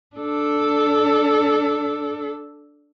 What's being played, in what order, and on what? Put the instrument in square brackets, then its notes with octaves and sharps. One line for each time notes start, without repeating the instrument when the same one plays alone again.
[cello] D4 A4